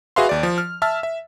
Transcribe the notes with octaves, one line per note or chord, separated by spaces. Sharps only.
F#4 G#4 B4 E5 F5 C6
D#2 D5
F3
F6
E5 A5 E6 F6
E5